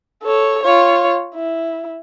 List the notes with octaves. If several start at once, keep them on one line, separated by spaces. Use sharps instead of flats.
A4 C#5
F4 C#5
E4